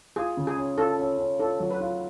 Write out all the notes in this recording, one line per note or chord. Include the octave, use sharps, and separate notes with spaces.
F4 G#4
C#3
G#4
C#4
F4 A4
C#4
C#4
F4 A4
F#3
B4
F4